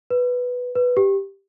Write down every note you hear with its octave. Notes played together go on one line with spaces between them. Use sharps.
B4
B4
G4